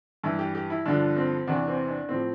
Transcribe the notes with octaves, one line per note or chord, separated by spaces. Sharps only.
G2 E3 E4
G4
G4
E4
G2 D3 F3 D4
C4
E2 C3 E3 D4
C4
D4
A2 F3 C4